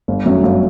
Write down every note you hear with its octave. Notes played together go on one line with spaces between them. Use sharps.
G1
F#2 F#3 A3
G1